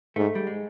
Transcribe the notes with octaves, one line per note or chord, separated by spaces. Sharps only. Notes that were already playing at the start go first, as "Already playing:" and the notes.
G#2 A3
G3
G#3